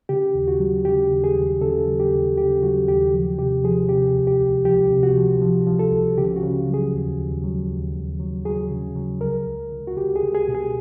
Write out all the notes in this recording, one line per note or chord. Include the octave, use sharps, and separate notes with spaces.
C#3 G4
D#2
F#4
F#3
C#3 G4
D#2
G#4
D#2
C#3 A4
F#3
G4
D#2
C#3 G4
F#3 F#4
D#2 G4
F3
C3 G4
F3 G#4
C3 G4
C#2
G4
C#2
F3 G4
C3
F#4
F3
F3
F3
A4
C#2
C#3 G4
F#4
C#3
F#3
G#4
D#2
D#2
F#3
D#2
D#2
F#3
F#3 G#4
C#3
F#3
C#2 A#4
C#2
C#2
F#4
C#2 G4
G#4
C#2
G#4
B2
G#4